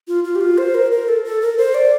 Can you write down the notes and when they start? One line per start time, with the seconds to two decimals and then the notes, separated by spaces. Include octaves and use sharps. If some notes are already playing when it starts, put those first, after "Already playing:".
0.08 F4
0.24 F4
0.35 G4
0.41 F4
0.58 C5
0.75 A#4
0.92 A#4
1.08 A4
1.25 A4
1.42 A#4
1.58 C5
1.75 D5